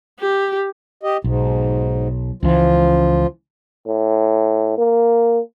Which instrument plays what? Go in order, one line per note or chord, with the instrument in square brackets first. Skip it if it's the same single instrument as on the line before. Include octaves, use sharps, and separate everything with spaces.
[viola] G4
[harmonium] G4 D#5
[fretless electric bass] B1 [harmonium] G#2
[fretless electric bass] C#2 E3 [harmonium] F3 F4
[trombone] A2
A#3